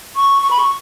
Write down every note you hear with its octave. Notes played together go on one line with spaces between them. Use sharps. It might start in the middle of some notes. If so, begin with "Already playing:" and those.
C#6
C#6
B5
C#6